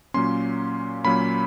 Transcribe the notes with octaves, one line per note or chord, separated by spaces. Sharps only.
A#2 F#3 A#3 C#4 C6
A#2 F#3 A#3 C#4 B5